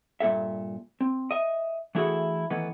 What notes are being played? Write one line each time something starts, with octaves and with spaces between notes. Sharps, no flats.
G2 A#2 A4 E5
C4
D#5 E5
E3 A3 E4 F#4 G#4 A4
D#3 E3 A3 B3